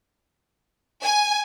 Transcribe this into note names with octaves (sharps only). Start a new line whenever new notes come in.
G#5